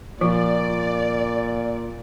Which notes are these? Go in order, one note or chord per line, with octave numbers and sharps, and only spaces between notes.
A#2 F3 F4 D5